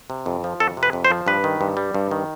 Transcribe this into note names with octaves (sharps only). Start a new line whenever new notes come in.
C3
F2
F3
F2 A4
C3
B4
F2
C5
F3
G2 B4
D#3
G2
G3
G2
D#3